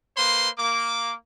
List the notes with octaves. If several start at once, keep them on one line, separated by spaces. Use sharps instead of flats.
A#3 B4 C5 C6
A#3 D6